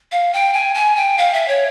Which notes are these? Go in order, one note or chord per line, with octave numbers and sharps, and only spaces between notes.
F5
G5
G#5
G#5
G5
F5
E5
C#5